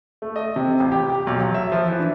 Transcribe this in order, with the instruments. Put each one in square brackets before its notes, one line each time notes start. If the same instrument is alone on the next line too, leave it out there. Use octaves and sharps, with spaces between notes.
[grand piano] A3
D#5
C3
A1
G4
G4
B1
F#3
E5
F3
E3
D4